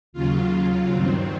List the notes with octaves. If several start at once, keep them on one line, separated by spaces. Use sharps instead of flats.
D#2 C#3 F#3 F4
F4
G2 D#3 F#3 C4